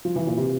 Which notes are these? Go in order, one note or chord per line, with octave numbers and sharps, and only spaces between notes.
F3
E3
A#2
C3